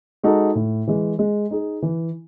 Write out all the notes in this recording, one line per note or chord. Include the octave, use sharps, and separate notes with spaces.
G#3 D#4 F#4 A4
A2
E3 G#3
G#3
D#4 G#4
E3